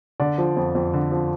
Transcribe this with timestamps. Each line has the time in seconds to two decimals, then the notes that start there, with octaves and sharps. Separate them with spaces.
0.20 D3 D5
0.38 F3
0.56 F2
0.75 F2
0.93 D3
1.12 F3